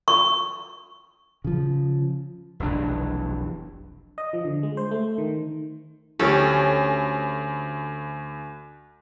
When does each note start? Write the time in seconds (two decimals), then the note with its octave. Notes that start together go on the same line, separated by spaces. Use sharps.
0.08 C#6
1.44 C#3 F3
2.60 F1 B1 E3 D4
4.18 D#5
4.33 F3
4.45 D3
4.63 G#3
4.77 C5
4.91 A3
5.18 D#3
6.19 D2 C#4 G4 A4